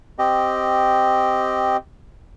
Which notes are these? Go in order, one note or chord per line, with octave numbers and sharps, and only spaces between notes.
C4 G4 D#5